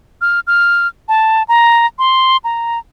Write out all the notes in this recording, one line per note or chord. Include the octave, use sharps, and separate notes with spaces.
F6
F6
A5
A#5
C6
A#5